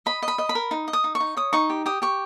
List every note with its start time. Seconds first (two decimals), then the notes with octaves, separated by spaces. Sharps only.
0.06 D#5 B5
0.22 D#5
0.28 B5
0.38 D#5
0.49 B5
0.55 A#4
0.71 D#4
0.88 D#5
0.93 D#6
1.04 D#4
1.15 C#6
1.20 D#4
1.37 C#5 D#6
1.53 D#4 C#6
1.70 G4
1.86 G4 D#6
2.02 G4 C#6